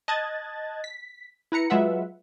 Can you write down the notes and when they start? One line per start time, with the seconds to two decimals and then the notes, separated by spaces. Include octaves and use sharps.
0.08 D#5 A5 F#6 G#6 A6
0.84 B6
1.52 E4 B4 A#5 C#7
1.70 F#3 G#3 F4 B4 E5 F#5